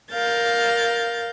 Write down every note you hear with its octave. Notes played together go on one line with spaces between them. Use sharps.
A#4 F5 G6 A6